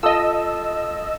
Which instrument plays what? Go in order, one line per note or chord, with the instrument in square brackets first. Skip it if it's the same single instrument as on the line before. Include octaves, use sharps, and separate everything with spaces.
[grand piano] F4 A4 D#6 [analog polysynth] D#5 E6